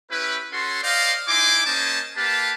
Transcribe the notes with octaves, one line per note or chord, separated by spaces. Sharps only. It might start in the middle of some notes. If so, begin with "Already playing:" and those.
C#4 E4 G4 B4
C#4 F#4 A4 C6
C5 D5 D#5 F5
D#4 E4 G#5 C6 D6
A#3 C#4 C5 D#5 G#5 A5
A#3 G4 B4 F5 A5